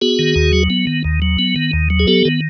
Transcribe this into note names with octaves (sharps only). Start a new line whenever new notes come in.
B3 F#4 G#4
D#3
D#2
F#3
B3
D#3
D#2
F#3
B3
D#3
D#2
F#3
G#4
B3 G4 A4
D#3